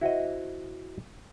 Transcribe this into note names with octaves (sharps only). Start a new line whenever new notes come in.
E4 F#4 C5 D#5